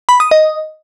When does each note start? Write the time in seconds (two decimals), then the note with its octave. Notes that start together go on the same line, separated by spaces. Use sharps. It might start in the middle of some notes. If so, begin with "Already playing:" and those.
0.09 B5
0.20 D#6
0.31 D#5